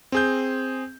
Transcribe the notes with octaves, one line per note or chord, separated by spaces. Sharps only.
C4 G#4 G6